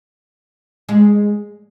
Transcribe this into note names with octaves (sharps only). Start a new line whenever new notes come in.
G#3